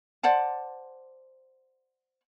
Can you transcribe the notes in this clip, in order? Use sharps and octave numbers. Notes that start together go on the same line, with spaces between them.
C5 D5 F#5 A5